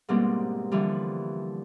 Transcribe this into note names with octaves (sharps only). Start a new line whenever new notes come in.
G#2 B2 G3 A#3 C4 D4
D3 E3 F3 G3